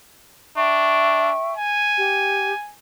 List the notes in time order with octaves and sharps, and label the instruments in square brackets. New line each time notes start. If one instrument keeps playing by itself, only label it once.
[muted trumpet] D4 [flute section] E5 G5 C#6
[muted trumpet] G#5
[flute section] G4